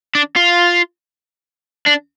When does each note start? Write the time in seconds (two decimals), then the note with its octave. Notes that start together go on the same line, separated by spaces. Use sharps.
0.15 D4
0.36 F4
1.86 D4